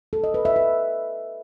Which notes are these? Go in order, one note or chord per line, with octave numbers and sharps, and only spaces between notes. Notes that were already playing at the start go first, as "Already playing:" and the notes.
A4
D#5
B4
E5
B4